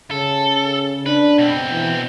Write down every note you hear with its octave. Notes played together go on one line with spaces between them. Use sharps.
C#3 A4
D4 B4
B2 C4
E3